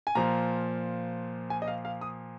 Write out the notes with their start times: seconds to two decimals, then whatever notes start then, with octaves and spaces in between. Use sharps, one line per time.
0.07 G#5
0.15 A#2 F3 A#5
1.50 G#5
1.62 D#5
1.68 F5
1.85 F5
2.01 D#6